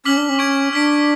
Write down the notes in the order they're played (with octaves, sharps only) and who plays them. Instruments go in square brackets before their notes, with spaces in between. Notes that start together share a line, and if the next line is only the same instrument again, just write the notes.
[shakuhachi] C#4 [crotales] D6 F6 B6 F#7
[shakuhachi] D4
C#4
[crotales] C#6 G#6 D7 F#7
[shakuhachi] D4 [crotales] F6 B6 D7